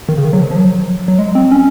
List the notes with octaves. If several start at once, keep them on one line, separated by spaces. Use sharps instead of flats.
D#3
C#3
D#3
F#3
F3
F3
F#3
F#3
G#3
C4
C#4